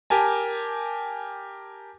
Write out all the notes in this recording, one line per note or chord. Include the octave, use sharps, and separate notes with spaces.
G4 A#4 G#5 A5